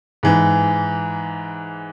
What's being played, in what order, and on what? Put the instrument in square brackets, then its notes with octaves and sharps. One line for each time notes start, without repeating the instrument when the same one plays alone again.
[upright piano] G#2 E3